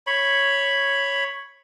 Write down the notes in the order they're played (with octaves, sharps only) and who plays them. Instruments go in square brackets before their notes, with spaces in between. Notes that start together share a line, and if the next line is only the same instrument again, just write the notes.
[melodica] C#5 B5